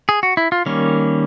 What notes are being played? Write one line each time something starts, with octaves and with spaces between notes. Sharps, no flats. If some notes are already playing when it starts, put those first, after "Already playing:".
G#4
F#4
E4
F4
D#3 G3 A#3 C#4